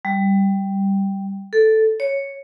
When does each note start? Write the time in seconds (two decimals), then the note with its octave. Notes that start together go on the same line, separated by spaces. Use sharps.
0.05 G3
1.53 A4
2.00 C#5